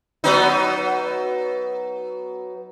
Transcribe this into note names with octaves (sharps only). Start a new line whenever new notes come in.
F#3 B3 D#4